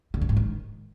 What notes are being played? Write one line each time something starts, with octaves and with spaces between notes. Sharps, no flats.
D3
F#2
G#2
D#3